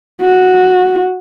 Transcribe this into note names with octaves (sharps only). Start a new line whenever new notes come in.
F#4